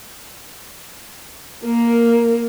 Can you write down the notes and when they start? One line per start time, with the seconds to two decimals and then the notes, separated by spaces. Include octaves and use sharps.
1.64 A#3 A#4